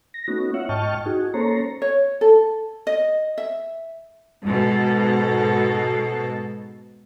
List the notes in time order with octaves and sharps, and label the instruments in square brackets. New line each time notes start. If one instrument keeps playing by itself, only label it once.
[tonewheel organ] A#6
A3 B3 C#4 D#4 F#4
F4 C#5 E5 F#5
G#2 D#5 G5 A5 C#6 F6
D#4 F#4 G#4
A#3 C#4 A4 C5 C#5 A#5
[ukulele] C#5
A4
D#5
E5
[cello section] G#2 B2 A4